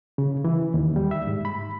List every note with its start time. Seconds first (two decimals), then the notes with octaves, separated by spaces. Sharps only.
0.18 C#3
0.44 E3
0.74 D#2
0.96 G3
1.11 E5
1.27 G#2
1.45 B5